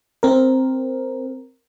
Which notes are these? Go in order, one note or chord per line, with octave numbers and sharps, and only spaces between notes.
C4 A#4